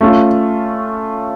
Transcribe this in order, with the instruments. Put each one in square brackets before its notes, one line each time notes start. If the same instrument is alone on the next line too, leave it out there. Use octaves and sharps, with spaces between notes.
[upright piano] A3 C#4 F4